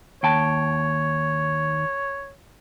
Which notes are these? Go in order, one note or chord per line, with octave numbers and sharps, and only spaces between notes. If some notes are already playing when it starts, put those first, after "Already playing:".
D#2 C#5 G5 A5